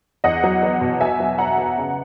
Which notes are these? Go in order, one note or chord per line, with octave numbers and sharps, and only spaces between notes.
E2 D#5 F#5
F#3
B3
B2
B3 E5 G#5
F#3
B3 F#5 A#5
B3
C#3